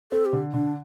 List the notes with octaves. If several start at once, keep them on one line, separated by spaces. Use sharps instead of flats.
C4 A4
G4
D3
D3 D4